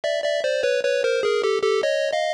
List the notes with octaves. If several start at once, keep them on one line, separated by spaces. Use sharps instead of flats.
D5 E5
D5 E5
C5 D5
B4 C#5
B4 C#5
A#4 C5
G#4 A#4
G4 A4
G4 A4
C#5 D#5
D#5 F5